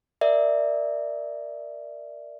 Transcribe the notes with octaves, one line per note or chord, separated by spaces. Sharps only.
A#4 D5 E5